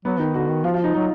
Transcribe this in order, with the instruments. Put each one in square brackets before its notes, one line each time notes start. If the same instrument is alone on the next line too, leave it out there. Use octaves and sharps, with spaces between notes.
[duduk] F#3 [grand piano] B3
[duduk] D#3 [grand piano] D#4
[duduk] D3 [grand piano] F#4
[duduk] D#3
[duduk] F3 [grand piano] F4
[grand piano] F4
D#4
[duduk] F#3 [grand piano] D#4